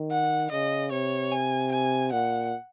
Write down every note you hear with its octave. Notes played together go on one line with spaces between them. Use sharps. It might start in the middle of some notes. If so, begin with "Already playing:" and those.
Already playing: D#3
F#5
C#3 D#5
C3 C#5
G#5
G#5
A#2 F#5